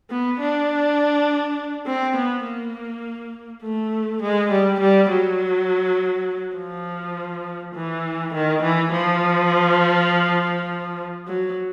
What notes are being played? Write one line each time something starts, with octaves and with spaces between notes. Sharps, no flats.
B3
D4
C4
B3
A#3
A3
G#3
G3
G3
F#3
F3
E3
D#3
E3
F3
F#3